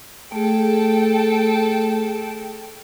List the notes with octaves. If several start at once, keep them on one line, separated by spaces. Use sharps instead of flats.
A3 G#4 A4 G5